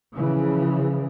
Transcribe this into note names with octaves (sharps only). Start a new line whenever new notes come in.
C#3 E3 F3